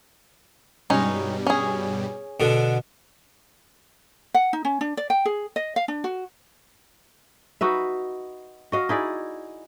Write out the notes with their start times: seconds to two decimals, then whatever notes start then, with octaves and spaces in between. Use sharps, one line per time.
0.90 G2 B2 G3 G#3 C#4 D#4
1.47 C#4 G#4
2.40 B2 D3
4.34 F#5
4.53 D#4
4.65 C#4
4.81 D4
4.97 D5
5.10 G5
5.26 G#4
5.56 D#5
5.76 F5
5.88 D4
6.04 F#4
7.61 D#4 F#4 B4 E5
8.72 F#4 D#5 F5
8.89 D#4 E4 G#4 D5